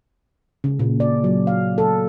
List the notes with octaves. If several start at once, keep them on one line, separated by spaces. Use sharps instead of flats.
C#3
A#2
D5
F#3
F5
A4